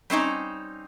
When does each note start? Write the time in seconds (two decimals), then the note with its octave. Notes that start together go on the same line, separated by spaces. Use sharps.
0.10 G3 C4 C#4 D#4